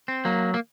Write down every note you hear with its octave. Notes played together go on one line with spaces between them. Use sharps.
C4
F#3 A#3
A#3